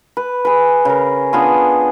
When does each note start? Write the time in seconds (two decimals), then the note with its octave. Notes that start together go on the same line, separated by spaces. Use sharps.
0.17 B4
0.45 G#4 B4
0.85 C#3 A#4
1.33 B3 D4 F4 G#4